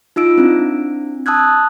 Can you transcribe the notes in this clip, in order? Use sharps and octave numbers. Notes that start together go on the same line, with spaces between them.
D#4 F4 E6 D7
C4 D4 E4
A5 D#6 E6 F#6 G#6